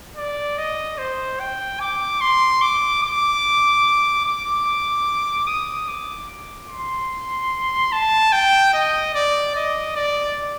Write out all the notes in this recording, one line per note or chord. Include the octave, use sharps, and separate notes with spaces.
D5
D#5
C5
G5
D6
C6
D6
D6
D6
D#6
D6
C6
A5
G5
D#5
D5
D#5
D5